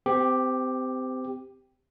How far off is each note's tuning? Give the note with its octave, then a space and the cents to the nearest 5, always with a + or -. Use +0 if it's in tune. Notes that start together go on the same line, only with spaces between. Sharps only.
C4 -30 G4 +5